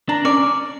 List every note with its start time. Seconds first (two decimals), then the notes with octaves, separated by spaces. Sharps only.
0.09 D4 A#5
0.25 C#4 D5